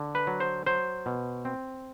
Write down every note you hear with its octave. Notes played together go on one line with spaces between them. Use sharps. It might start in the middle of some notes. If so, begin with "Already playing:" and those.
Already playing: D3
B4
F#3
C5
F#3 C5
B2
C4